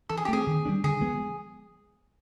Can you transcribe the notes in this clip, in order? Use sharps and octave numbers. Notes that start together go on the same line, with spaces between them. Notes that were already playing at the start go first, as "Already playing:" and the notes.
E3 A4
G#4
G4
A3 C4 G#4
D#3
G3 B3 D4
D3 G#4
F3 G#3 B3